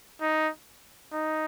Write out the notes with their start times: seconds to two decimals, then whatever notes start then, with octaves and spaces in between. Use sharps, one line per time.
0.21 D#4
1.13 D#4